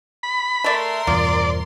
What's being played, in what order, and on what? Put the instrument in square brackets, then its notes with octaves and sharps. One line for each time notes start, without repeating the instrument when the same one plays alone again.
[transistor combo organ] B5
[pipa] A3 D5 E5 [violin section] A#4 C6
[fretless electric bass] E2 G2 B2 [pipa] F3 [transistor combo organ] D5